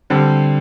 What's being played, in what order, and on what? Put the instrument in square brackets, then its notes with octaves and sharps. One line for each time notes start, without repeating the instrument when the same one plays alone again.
[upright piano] D3 G3 C4